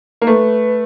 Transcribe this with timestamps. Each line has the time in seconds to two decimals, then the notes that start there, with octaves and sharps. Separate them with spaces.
0.22 A#3
0.27 A3 B4